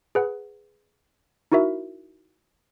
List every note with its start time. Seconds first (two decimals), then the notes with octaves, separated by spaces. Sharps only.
0.15 G#4 B4 F#5
1.52 D#4 E4 F#4 A#4 E5